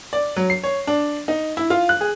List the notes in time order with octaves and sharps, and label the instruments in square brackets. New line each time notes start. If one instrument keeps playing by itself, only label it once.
[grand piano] D5
F#3
C7
C#5
D4
D#4
E4
F4
F#6
G#4